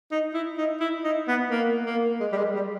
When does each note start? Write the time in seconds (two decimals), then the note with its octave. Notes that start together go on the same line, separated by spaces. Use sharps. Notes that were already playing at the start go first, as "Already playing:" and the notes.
0.11 D#4
0.34 E4
0.58 D#4
0.80 E4
1.04 D#4
1.28 B3
1.51 A#3
1.86 A#3
2.20 G#3
2.33 G3
2.37 G#3
2.55 G3